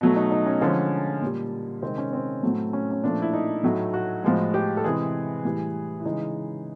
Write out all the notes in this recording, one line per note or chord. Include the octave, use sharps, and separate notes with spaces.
B2 F#3 A3
D#4
D#4
C#4
D3 F3 G#3 C#4
A#2 G3
C3 D#3 G#3 C4
C#4
C4
A2 F#3 A3
C#4
C#4
A#2 F3 A3 D4
E4
D#4
A2 F#3 A3
F#4
A2 F3 G#3
G4
A4
C3 E3 G#3 G#4
A2 E3 G3
E4
C#3 E3 G#3 D#4